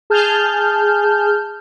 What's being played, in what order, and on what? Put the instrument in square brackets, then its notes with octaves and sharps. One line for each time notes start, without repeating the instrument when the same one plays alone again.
[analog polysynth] G#4 A5 F6 G6